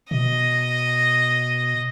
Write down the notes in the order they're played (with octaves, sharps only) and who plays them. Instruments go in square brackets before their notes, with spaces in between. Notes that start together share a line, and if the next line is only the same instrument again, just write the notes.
[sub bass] B2 [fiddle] D#5